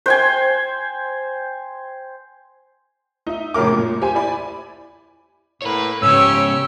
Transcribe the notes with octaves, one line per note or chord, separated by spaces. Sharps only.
C5 G5 G#5
D#4 E5
F#2 A2 C#3 A#4 D6
A#2
G4 C5 G#5
E4 D5 G#5 B5
A2 A#3 B4 C#5
G#2 C#3 C#4 G4 C#5 E6